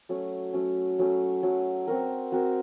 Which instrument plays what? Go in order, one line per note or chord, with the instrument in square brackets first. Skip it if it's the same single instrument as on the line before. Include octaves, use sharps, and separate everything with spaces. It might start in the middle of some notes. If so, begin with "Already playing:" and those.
[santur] F#3 A3 C#4
F#3 A3 C#4
F#3 A3 C#4
F#3 A3 C#4
C4 F#4 A#4
C4 F#4 A#4